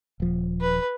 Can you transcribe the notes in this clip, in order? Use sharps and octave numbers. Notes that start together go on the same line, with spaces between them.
D#1 F3
B4